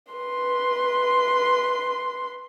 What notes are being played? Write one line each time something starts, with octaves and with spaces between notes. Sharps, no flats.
B4 C6